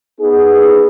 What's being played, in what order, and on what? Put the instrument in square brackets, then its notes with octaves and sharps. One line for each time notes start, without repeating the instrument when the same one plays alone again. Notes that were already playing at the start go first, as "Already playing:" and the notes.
[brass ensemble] B3 D#4 G#4